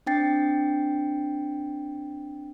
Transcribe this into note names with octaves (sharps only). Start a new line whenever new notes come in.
C4 D4 G5 A6 C7